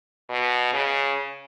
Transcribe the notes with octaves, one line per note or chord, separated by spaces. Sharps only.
B2
C#3